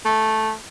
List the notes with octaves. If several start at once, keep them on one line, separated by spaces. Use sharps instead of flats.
A3